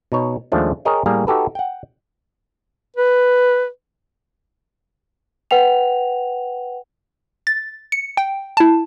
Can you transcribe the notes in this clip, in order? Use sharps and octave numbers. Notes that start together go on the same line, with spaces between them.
B2 D#4 C#5
D#2 F3 G#3 A3 C#4 D4
G#4 A#4 C#5 D#5 G5
A2 G3 A#3 G#4 A#4
D#4 F#4 G4 A4 B4
F#5 G5
B4
B4 F#5 G5 F7
A6
C#7
G5
E4 A5